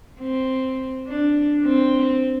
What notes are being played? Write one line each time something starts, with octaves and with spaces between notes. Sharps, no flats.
C4
D4
C4